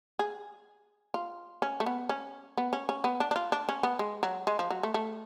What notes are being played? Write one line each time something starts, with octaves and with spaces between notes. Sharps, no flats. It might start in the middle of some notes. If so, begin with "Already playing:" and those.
G#4
F4
C#4
A3
B3
C#4
B3
C#4
C#4
B3
D4
D4
F4
D4
C#4
B3
G#3
F#3
G#3
F3
F#3
A3
A3